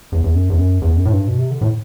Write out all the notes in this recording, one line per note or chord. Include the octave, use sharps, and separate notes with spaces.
E2
E2
F#2
E2
F#2
E2
F#2
A2
G2
B2
C3
D3
A2